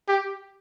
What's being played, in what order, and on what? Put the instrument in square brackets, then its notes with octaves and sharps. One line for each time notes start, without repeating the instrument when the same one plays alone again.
[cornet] G4